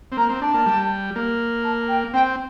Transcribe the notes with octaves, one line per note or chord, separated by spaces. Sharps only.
C4
A#3 A#5
C4
D4 A5
A#3
G3
A#3
A5
G5
C4 G5